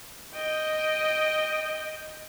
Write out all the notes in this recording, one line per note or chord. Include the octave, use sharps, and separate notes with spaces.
D#5 G5